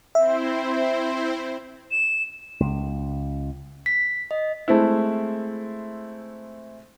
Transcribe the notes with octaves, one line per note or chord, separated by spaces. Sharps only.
C4 E4 C5 E5
E7
C#2
B6
D#5
G#3 A3 C4 E4